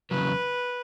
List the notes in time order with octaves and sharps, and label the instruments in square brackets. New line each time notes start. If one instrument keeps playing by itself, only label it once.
[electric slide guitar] E2 C#3 F#3 [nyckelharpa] B4